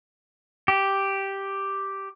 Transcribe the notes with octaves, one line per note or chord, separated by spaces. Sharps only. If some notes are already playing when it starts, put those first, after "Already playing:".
G4